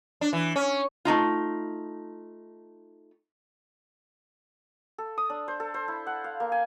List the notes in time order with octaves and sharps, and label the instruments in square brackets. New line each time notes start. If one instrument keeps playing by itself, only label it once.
[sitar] D4
E3
C#4
[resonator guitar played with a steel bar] A3 C#4 D#4 F4
[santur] A4
D#6
D4
C5
A4
C5
E4
F#5
F5
A#3
G#5